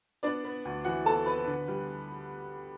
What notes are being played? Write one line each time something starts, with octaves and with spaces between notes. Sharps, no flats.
B3 D4 D5
B3
D2
E3 F#4 F#5
B3 A4 A5
B3 B4 B5
D3
G3